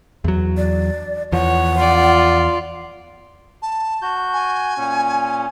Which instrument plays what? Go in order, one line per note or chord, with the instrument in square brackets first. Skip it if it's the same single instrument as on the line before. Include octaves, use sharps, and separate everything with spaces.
[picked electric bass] E2 F#3
[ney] D5
[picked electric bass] E2 F3 [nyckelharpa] C#5 [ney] F#5
[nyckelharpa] F4 D5
[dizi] A5
[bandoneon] F#4 G6
[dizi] G#5
[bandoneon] A#2 C#4